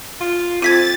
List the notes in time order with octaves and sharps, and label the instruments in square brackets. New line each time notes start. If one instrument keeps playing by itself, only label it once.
[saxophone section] F4
[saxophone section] F2 C4 [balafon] F4 [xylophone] G#6 B6 D#7 [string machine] A6